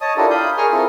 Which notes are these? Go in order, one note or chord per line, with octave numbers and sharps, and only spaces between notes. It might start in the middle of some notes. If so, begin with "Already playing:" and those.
C#5 D#5 A5 D#6
D4 E4 F4 G4 A4 A#4
F5 B5 D#6 G6
G#4 A#4 G#5 C#6 D#6 F6
C4 E4 F4 A4 A#4